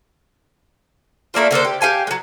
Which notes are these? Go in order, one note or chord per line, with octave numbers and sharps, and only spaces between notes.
A3 A#3 D4 F4
D3 A#3 A4 C5
G4
G4 F5 G#5 A5
F#3 G#3